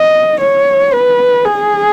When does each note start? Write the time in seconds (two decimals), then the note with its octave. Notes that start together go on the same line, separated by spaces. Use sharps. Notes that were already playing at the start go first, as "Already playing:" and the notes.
Already playing: D#5
0.40 C#5
0.93 B4
1.45 G#4